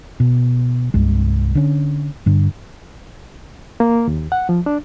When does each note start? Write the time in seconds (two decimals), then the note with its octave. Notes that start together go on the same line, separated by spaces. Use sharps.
0.20 B2
0.94 C2 G2 G#3
1.55 D3 C#4
2.26 G2 D3
3.80 A#3
4.07 D#2
4.32 F#5
4.49 F3
4.66 D4